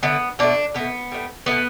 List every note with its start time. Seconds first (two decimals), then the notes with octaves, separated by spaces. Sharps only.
0.03 D3 A3 B3
0.39 B2 A3 D4
0.74 B2 A3 B3
1.12 A2 G3
1.46 B2 A3 B3